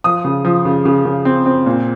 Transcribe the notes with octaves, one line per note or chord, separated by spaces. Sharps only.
F3 D#6
C#3
F3
C#3
C#3
C#3
C4
C4
A#2